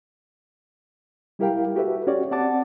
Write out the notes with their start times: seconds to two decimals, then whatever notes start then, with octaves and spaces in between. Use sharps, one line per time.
1.39 G3 E4 G4 A#4 F5 G5
1.75 F#4 G4 A4 B4 E5
2.07 C#4 F#4 G4 C#5 D5
2.31 C4 D5 F#5 A5 D6 A6